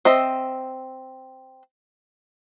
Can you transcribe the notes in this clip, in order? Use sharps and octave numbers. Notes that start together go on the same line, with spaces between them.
C4 D#5 E5